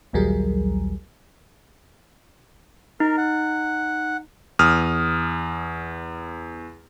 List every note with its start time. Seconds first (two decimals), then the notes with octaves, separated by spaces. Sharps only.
0.13 A#1 D#2 F#3 G3 G#4 A#4
3.00 D#4 A#4
3.18 F#5
4.59 E2 D#6 F6